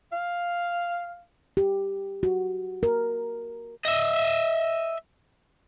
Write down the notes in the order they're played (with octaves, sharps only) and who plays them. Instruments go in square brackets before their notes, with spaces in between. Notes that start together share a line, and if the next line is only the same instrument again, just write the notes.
[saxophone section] F5
[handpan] G4
F#4
A#4
[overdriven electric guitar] D#5 E5